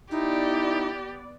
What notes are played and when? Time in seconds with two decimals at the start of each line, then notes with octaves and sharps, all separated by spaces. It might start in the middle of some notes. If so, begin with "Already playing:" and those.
0.11 B3 D#4 E4 G4 D5